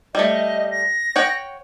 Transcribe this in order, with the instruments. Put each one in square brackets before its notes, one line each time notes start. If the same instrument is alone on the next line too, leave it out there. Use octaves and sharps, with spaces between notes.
[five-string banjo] G3 A3 [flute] D#5
[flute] A#6
[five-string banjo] C#5 F#5 G5